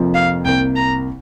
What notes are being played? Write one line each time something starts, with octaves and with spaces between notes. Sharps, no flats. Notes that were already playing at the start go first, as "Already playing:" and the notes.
Already playing: F1 F2 C3 F3 A#3
F5
C2 C3 A#3 G5
A#5